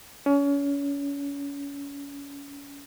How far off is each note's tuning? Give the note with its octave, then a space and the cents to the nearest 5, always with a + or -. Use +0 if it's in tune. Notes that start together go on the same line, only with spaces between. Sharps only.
C#4 +30